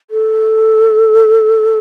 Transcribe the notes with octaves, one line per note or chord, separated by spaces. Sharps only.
A4